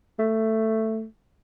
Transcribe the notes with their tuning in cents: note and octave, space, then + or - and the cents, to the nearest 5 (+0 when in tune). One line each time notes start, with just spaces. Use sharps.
A3 +10